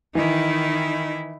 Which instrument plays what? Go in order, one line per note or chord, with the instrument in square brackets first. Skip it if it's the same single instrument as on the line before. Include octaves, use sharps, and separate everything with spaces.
[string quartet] D#3 [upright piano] E3 [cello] D#4 E4